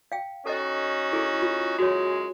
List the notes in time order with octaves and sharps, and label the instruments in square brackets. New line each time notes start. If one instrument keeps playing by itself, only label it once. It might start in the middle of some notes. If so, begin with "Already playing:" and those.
[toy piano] F5 G5
[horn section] C#4 D#4 F#4 [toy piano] A4 D#5
[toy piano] E4 G#4 A4
F4
[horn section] F#2 G#3 [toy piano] F#4 C#5